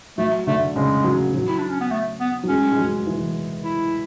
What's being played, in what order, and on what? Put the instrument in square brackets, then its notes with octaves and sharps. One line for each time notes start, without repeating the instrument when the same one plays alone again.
[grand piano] F#3 [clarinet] A3
[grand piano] D3 [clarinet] A3
[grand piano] C#3 [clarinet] G#3
[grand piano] F#3
F#3
[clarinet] E4
D4
C#4
B3
A3
B3
[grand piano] F#3
[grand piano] G#3 [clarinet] C#4
[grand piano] G#3
F#3
E3
[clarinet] E4